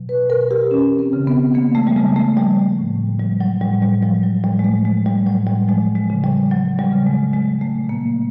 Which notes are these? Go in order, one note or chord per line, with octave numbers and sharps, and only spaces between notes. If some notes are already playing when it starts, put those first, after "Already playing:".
Already playing: B2 F#3
B4
B2 A#4
G4
E3 C#4
C4
C#3
B3
E3 A#3
A3
G3
C#3 G#3
A3
F3 G3
A2
F3 G3
F#3
A2 G3
G3
F3 G3
F#3
A2 G3
G#3
A3
F3 G#3
G3
A2 F#3
G3
F3 G#3
G#3
C#3
G3
F3 F#3
G3
C#3
G#3
F#3 G#3
A3
A#2
A#3